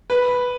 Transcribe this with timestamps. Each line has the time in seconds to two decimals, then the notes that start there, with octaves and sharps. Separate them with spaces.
0.10 B4